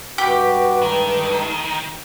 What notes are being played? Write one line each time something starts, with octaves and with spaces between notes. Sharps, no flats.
G2 F#4 G4 B4 G5
D#3 G#3 A3